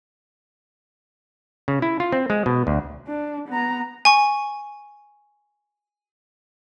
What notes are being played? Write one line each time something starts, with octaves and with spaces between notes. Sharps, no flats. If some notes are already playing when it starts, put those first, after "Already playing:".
C#3
E4
F4
C4
G#3
B2
D2
D4
B3 A#5
G#5 C#6